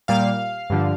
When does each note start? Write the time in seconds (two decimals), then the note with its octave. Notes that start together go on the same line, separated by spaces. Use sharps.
0.08 A#2 G3 A#3 F5
0.70 G2 D3 F3